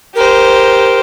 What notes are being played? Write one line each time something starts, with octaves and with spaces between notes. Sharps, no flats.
G4 A#4 C5